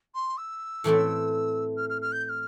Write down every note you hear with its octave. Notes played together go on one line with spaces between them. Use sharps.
C6
E6
A2 E3 A3 C4
F6
F6
F6
G6
G6
F6